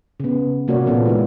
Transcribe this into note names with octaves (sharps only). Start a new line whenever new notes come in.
C#3 B3
C3 A#3 F#4 A#4 C#5 D5
A#2 E3 B3 C4 F4 A4
G#3 D#4 E4